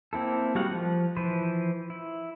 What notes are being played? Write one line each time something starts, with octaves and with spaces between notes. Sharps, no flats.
A#3 C4 E4 A4
G3 G#3 F#4 F5 F#5
F3
E3 F3 B4 C5
E4